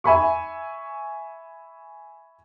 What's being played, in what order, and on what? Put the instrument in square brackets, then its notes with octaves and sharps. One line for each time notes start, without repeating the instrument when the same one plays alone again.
[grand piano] E5 G#5 B5 C#6